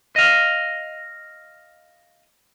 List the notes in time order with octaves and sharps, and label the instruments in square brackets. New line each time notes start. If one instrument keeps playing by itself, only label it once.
[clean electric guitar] D#5 F5